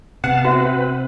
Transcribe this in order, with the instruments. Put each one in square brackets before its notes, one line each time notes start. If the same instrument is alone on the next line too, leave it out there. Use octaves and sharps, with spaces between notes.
[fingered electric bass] C3 [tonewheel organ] B3 F5 A5 [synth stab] F#5
[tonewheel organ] C4 B4 [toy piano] F#4 E5